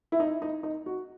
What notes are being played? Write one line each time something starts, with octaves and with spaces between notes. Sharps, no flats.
E4
D#4
D#4
D#4
F#4